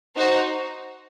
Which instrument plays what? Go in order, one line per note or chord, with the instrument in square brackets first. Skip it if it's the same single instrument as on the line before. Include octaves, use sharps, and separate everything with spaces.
[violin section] D#4 F#4 C5